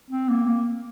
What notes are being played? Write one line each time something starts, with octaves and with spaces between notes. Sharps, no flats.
C4
A#3
A#3